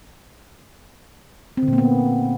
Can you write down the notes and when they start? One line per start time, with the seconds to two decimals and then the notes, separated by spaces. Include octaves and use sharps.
1.57 C4
1.63 D3
1.68 A#2
1.73 A#3
1.78 B3